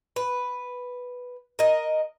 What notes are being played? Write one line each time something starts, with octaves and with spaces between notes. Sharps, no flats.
B4
A#4 D#5